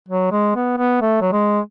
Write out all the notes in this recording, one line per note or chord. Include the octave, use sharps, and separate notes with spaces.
F#3
G#3
B3
B3
A3
F#3
G#3